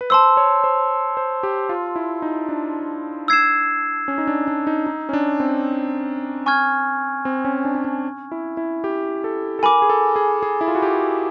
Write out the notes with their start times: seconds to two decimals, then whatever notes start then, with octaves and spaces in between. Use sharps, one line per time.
0.01 B4
0.10 C5 A5 C6 E6
0.37 C#5
0.64 C5
1.17 C5
1.43 G4
1.69 F4
1.96 E4
2.22 D#4
2.49 D4
3.28 E6 G#6 C7 E7
4.08 C#4
4.18 D#4
4.27 D4
4.48 D4
4.67 D#4
4.87 D#4
5.09 C#4
5.13 D4
5.40 C4
6.46 G#5 C#6 F6 G#6
7.25 C4
7.45 C#4
7.65 D4
7.75 C#4
7.84 D4
8.32 E4
8.57 E4
8.84 G4
9.24 A4
9.59 A4
9.63 A#4 G#5 B5 D6
9.82 G#4
9.90 A4
10.16 G#4
10.43 G#4
10.61 E4
10.68 F4
10.75 F#4
10.82 G4